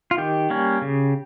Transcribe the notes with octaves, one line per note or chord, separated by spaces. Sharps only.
F4
D#3 G4
G3 A#3 C#4
C#3